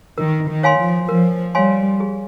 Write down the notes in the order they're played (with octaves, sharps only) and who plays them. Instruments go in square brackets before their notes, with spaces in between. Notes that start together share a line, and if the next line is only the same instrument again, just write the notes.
[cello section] D#3 [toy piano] A#4
[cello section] D#3
[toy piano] C#5 F5 G#5 C6
[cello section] F3
[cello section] F3 [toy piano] A#4
[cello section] G3 [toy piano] C#5 F5 G#5 C6
[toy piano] G#4